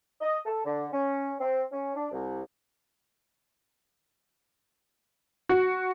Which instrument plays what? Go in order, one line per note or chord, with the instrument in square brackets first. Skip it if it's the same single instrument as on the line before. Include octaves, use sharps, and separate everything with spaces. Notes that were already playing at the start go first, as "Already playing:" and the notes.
[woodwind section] D#5
A4
D3
C#4
C4
C#4
D4
C2
[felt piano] F#4